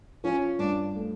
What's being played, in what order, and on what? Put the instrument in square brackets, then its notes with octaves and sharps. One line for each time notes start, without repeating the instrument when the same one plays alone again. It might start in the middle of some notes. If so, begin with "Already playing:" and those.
[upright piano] F3 [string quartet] C#4
[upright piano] G2 [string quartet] D4
[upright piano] A3